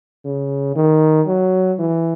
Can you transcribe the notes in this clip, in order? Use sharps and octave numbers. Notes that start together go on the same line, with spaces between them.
C#3
D#3
F#3
E3